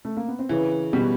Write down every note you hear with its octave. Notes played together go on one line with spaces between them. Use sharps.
A3
A#3
B3
C4
C#3 E3 C#4
B2 G3 B3